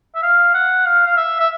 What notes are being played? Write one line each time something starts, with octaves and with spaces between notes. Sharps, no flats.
E5
F5
F#5
F5
F5
E5
E5